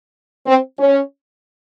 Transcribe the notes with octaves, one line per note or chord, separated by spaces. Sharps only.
C4
C#4